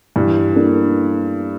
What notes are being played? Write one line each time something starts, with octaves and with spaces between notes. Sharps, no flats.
G2 E3
A#3 D4 A4